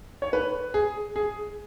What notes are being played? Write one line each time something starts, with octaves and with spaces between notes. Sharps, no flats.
C#5
B4
G#4
G#4